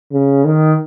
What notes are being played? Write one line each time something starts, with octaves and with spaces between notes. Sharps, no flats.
C#3
D#3